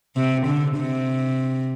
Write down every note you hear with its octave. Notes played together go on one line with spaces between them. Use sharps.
C3
D3
C3